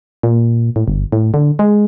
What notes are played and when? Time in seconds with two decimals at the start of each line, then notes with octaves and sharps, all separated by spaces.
0.23 A#2
0.76 A2
0.88 G1
1.12 A2
1.34 D3
1.59 G#3